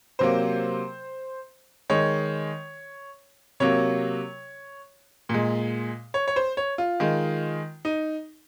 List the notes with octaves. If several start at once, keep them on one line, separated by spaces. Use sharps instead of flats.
C3 F#3 A#3 C5
D#3 G#3 C#5
C3 F#3 A#3 C#5
A#2 G#3
C#5
C#5
C5
C#5
F4
D#3 G#3
D#4